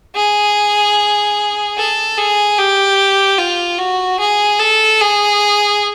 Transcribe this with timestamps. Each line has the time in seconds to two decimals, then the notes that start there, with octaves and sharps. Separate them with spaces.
0.15 G#4
1.78 A4
2.18 G#4
2.58 G4
3.38 F4
3.79 F#4
4.19 G#4
4.59 A4
5.01 G#4